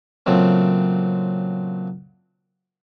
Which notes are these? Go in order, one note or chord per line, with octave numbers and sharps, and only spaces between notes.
A#2 C#3 F#3 A3 C4